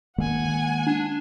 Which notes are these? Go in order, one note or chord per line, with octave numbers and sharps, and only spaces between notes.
D#3 G#3 A#3 F#5 G#5
D4